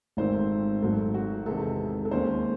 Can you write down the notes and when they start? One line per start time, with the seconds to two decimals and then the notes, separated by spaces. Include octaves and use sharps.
0.17 G#1 G#2 D#3 A3 C4 C5
0.82 G#1 G#2 F#3 A3 A4
1.14 F#4
1.46 E2 C3 D#3 G#3 A4
2.05 A4
2.11 D#2 D#3 G#3 C#4 C5